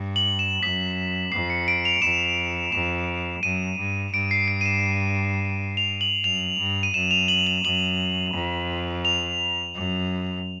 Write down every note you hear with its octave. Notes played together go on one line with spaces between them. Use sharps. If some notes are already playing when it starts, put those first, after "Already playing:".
Already playing: G2
F#7
E7
F#2 B6
F2 C7
C#7
D7
F7
F2 E7
F2 E7
F#2 D#7
G2
G2 D7
C7
D7
D#7
E7
F7
F#7
F#2 F7
G2
D#7
F#2 E7
F7
F#7
F7
F#2 F#7
F2
F7
F#2